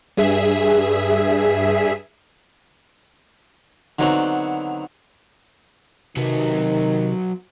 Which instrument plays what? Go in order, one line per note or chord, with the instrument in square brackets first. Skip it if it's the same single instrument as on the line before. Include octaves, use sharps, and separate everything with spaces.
[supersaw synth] G2 G#4 E5 B6
[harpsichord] D3 D#3 F#3 B3 C4
[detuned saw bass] C3 [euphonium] D#3 [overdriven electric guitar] F#3 B3